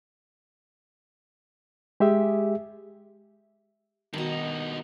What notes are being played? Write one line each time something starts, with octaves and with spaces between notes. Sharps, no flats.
G#3 G4 G#4 E5
G2 B2 D#3 D#4